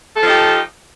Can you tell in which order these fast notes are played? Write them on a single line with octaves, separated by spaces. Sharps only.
A4 F3 D#4 G4